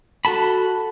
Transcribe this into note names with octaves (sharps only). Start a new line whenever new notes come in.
F#4 A4 A5 B5